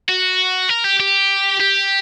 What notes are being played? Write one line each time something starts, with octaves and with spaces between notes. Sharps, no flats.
F#4
A#4
G4
G4
G4